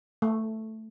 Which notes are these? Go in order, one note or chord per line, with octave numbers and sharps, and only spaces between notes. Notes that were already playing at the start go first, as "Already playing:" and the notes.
A3